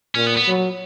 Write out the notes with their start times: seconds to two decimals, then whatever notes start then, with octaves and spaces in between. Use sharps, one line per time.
0.15 A#2 C#4
0.27 B3
0.37 B3
0.47 F#3